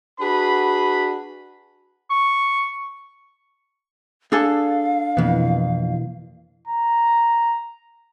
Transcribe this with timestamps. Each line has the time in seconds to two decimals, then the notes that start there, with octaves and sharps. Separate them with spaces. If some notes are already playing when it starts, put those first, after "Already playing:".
0.20 D4 F#4 G#4 B4 B5
2.10 C#6
4.32 D4 G#4 A4 F5 G#5
5.17 F2 B2 E3 A#3 B3
6.67 A#5